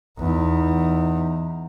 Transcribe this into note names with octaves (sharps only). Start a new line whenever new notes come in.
E2 D#4